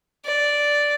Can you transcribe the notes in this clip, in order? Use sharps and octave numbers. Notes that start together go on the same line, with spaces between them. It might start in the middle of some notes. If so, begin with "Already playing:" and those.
D5